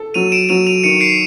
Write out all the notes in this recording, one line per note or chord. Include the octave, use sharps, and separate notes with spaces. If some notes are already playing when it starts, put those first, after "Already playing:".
Already playing: A4
F#3 D#7 F7
D7 E7
F#3 D#7 F7
D#7 F7
D#3 C#7 D#7
C7 D7